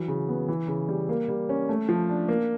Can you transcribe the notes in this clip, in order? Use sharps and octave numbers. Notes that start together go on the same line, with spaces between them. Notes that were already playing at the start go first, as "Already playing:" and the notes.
Already playing: E3 F#3
C#3
B3
E3
C#3
G3
A#3
G3
C#4
A3
F3
D4
A#3